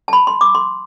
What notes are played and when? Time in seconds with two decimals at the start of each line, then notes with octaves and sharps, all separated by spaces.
0.08 A5
0.13 B5
0.27 C6
0.41 D6
0.55 C6